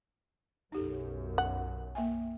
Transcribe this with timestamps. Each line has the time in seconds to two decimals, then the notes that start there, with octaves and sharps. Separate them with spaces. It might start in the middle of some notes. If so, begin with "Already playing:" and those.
0.72 B1 F#2 D#4 G4 A4
1.38 F#5
1.95 A#3 E5 G#5